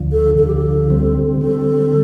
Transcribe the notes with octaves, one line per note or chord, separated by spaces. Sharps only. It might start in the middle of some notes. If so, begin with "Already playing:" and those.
Already playing: D2 D3 F3
A4
D2 D3 F3 A4
G4
A4
D3 G3 C4
D3 G3 C4 A4